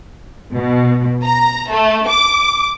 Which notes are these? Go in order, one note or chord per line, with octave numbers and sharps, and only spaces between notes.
B2
A#5
A3
D6